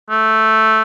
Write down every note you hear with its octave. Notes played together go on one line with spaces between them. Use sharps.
A3